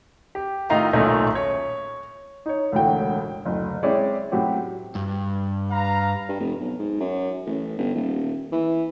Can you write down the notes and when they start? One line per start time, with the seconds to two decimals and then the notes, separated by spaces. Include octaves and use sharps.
0.35 G4
0.70 A2 D#3 D#4 F4 F5 A#5
0.93 D#1 B1 A#2 A3 C#4 D#4
1.35 C#5
2.46 D#4 C#5
2.72 E1 C#2 A2 D3 F#4 G5
3.46 F#1 D2
3.83 G#3 C4 C#4 E4 C#5 D5
4.32 A2 F#3 C4 F#4 G4
4.95 G2
5.71 B4 F5 A#5
6.29 G2
6.40 F1
6.60 B1
6.79 G#2
7.00 F#2
7.46 A1
7.78 G1
7.95 D#1
8.52 E3